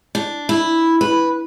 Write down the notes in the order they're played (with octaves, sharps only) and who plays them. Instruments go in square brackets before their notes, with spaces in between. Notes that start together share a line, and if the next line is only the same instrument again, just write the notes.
[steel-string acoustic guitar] D4
E4
B4